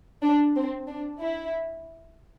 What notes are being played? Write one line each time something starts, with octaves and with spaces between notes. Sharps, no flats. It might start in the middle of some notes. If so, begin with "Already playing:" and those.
D4
C4
D4
E4